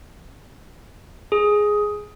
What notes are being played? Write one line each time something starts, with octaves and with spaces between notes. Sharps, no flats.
G#4